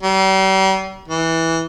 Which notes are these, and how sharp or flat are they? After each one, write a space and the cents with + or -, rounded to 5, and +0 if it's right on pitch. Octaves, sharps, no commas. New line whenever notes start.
G3 -40
E3 -10